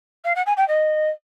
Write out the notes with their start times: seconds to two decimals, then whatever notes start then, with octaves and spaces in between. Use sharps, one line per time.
0.24 F5
0.35 F#5
0.46 G#5
0.57 G5
0.67 D#5